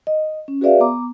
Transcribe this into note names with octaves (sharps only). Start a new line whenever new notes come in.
D#5
C#4
F#4 G#4 B4 D5 E5 F5
B3 A#5 D6